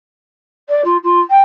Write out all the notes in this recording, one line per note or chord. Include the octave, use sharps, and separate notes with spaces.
D5
F4
F4
G5